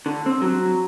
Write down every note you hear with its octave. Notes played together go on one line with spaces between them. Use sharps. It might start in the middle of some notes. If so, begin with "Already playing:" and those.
D3
C4
F#3